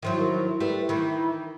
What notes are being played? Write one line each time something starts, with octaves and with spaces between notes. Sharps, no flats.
D#3 F3 F#3 E4 E5
A#4
G3 A3 B4
D#3 E3 B5